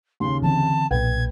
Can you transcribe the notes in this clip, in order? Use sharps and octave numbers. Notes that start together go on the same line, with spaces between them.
D#2 C#3 C6
D3 E3 C4 A5
B1 A#2 B4 G5 G#6